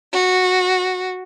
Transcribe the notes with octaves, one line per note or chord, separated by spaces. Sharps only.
F#4